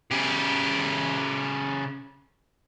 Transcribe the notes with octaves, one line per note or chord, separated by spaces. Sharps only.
C#3 G4